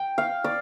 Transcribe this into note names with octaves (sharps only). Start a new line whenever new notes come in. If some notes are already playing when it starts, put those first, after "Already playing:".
Already playing: G5
F5
D5